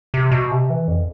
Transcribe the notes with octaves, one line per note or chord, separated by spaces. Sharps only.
C3
B2
C3
E3
F2